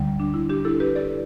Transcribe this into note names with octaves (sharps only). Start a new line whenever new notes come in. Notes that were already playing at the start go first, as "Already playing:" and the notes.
Already playing: D2 D3 G3
D4
E4
D4 G4
E4 A4
G4 B4
A4 D5